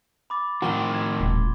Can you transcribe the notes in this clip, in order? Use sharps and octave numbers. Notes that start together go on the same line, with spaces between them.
B5 D6 A6
A2 D#3 F3 C4 F#4 C6 G7
G#6
D#1